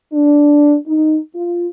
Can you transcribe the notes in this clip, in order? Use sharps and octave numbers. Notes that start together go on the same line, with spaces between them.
D4
D#4
F4